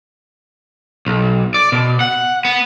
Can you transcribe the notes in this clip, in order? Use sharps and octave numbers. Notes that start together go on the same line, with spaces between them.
B1
D5
B2
F#5
B3